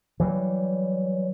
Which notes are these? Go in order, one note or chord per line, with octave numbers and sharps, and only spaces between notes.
E3 F#3 G3